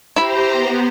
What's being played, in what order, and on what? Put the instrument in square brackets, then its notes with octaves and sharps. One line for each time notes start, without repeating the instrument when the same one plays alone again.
[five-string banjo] E4 B5 [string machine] G4 C5 A#5
[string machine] B3